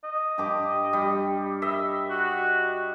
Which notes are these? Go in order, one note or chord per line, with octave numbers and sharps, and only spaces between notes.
D#5
G2 G4 D6
G3
D#5 E5
F#4